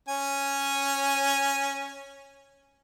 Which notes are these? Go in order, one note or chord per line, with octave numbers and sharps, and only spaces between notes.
C#4 G#5